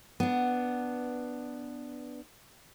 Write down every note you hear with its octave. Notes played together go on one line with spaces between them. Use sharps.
B3 D4